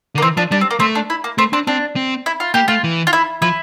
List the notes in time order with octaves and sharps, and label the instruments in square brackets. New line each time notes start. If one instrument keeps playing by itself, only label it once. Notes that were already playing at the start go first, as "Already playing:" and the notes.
[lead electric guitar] D3
[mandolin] A#3
[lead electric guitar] E3 [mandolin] C4
[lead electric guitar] F3 [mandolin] D4
[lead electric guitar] G3 [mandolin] D4
[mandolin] C4
A#3
[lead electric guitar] A3 [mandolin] C4
[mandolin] D4
E4
A#3
[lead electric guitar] A3 [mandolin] C4
[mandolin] C4 [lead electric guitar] D4
[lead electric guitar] C4 [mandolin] D4
[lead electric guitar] C4
[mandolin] E4
F4
[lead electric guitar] A#3 [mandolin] G4
[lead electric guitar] A3 [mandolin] F4
[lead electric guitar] E3
[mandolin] F4
E4
[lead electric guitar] F3 [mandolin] E4